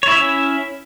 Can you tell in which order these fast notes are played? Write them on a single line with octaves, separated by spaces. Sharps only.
C#5 E4 E5 C#4